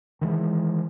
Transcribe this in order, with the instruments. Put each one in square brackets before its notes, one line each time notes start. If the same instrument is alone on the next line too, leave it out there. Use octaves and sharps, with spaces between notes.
[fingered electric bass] D#3 E3 G#3